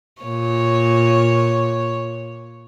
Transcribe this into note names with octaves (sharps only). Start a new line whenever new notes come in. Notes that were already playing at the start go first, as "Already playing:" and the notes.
A#2 C#5